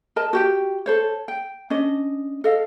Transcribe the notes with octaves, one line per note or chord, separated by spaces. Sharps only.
A#4 D#5 A5
F#4 G4 G5
A4 C5 C#5
G5
C#4 D4 D#5
A4 D#5 F5